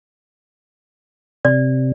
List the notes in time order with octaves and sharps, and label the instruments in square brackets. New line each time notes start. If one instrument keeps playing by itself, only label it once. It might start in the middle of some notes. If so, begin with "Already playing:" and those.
[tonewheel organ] C3 [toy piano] D5